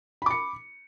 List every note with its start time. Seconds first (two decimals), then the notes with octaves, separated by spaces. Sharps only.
0.22 B5
0.26 D6
0.31 C#7